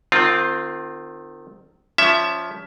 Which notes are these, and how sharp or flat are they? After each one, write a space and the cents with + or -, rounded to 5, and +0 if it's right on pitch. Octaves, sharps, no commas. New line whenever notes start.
D#3 -35 C4 -10 F4 +0
F3 +0 C#4 +25 E5 +10